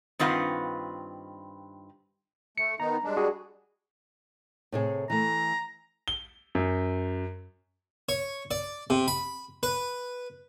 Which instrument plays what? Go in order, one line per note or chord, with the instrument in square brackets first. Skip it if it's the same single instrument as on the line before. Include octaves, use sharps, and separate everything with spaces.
[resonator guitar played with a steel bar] G2 D#3 C4 F4 B4 F#5
[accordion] A3 [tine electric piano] C#7
[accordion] D#3 B3 D#4 [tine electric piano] A#5
[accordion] G3 G#3 D4
[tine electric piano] F#4 G#4
[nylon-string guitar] A2 C3 G#4
[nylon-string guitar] E3 A3 [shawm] A#5
[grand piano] G7
F#2
[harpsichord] C#5
D5
C3
B5
B4